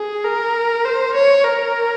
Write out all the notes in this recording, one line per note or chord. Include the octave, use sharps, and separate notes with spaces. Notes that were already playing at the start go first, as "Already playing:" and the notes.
Already playing: G#4
A#4
C5
C#5
A#4